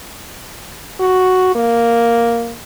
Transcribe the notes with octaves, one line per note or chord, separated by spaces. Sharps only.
F#4
A#3